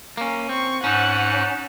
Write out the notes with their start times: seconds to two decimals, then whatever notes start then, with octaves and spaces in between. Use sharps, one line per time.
0.17 A#3 C#4
0.49 C4 C#6
0.84 G#2 C#4 D#4 F#5 A5